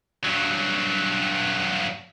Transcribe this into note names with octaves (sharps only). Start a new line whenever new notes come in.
G2 F#3